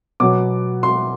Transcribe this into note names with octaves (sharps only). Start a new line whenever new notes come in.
B2 F#3 B3 D6
C6